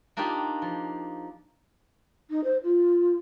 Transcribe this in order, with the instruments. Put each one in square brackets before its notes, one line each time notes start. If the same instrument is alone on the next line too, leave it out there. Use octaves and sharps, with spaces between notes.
[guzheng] A#3 D4 D#4 F4 G4
F3
[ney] D#4
C5
F4